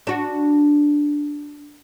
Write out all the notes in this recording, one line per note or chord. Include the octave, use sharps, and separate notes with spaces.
D4 F#4